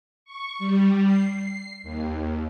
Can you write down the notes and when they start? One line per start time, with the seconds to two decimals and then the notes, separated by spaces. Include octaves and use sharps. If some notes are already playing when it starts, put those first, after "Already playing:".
0.25 C#6
0.59 G3
1.05 C7
1.83 D#2